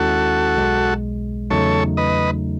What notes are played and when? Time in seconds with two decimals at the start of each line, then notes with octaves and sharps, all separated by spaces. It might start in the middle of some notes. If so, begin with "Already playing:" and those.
Already playing: D#2 D#3 G#3 C#4 E4 F#4 A4
0.57 B1 B2 G#3
1.51 E2 C#3 F#3 A3 D#4 A4 C#5
1.97 B4 D#5